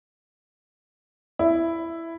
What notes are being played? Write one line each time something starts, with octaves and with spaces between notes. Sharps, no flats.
E4